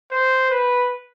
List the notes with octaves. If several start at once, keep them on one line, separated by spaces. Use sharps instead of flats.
C5
B4